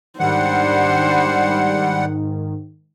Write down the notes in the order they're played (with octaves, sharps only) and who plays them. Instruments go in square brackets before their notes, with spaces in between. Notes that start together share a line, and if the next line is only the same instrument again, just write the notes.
[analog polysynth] G#2 D#3 [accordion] G3 F#5 [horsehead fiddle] D4 C5